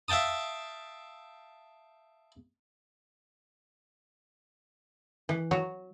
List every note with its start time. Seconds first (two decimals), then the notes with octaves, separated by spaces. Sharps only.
0.08 E5 F5 G5 A5 D#6
5.29 E3
5.51 F#3